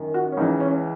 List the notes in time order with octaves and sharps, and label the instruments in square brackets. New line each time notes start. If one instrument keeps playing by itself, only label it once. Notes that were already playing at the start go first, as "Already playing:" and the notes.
Already playing: [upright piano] F#2 D#3
F#4
C#4
C#2 C#3 E3 D#4
C#4